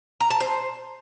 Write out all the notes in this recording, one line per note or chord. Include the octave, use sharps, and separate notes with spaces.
A#5
A5
C5